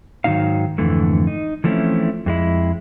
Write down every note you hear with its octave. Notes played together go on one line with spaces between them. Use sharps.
G#2 D#3 E3 F#3 D#4 F5
F2 G#2 D3 E3 A3
D#4
E3 F3 A3 C4 C#4 E4
F2 G#3 E4